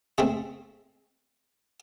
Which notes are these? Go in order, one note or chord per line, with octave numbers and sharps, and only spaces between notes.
G#3 A3 C4